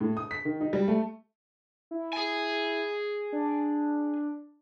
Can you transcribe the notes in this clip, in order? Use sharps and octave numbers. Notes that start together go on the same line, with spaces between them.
A2
D#6
B6
D#3
D#4
G3
A3
E4
G#4 G#5
D4